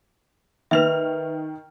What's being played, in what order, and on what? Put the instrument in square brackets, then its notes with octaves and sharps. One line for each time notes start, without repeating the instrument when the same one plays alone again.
[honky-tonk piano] D#3 F6 F7 [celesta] B4 E5